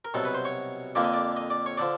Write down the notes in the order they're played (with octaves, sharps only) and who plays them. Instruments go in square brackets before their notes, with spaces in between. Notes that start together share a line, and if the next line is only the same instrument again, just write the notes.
[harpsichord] A#4
C2 B2 F#3 A4
B4
C5
C#5
F2 D3 F3 A#3 D5
D#5
D5
D#5
D5
C#5
D3 F3 D5